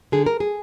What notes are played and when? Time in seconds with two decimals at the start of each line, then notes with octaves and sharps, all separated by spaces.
0.12 D3 G#4
0.26 A#4
0.40 G#4